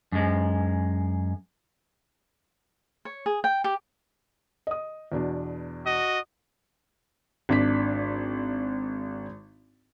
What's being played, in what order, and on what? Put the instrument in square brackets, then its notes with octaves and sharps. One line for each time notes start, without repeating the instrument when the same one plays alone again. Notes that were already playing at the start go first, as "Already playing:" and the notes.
[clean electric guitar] F#2 G#3
[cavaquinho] C#5
G#4
G5
G4
[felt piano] D#5 D#6
E2 B2 D4
[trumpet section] F#4 D#5
[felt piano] G#1 D4 B6